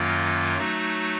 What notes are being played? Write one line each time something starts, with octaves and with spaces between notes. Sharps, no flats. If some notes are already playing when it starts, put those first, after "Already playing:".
Already playing: F#2 D#3 F#3 A#3 F4
F#3 A3 D#4 F#4